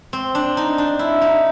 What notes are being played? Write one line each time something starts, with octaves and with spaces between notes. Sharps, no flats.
C4
D4
D#4
D4
E4
D#4